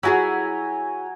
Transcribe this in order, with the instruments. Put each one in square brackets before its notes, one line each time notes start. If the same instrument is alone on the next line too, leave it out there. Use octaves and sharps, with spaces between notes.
[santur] F#3 G#5 A#5 [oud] E4 F#4 G#4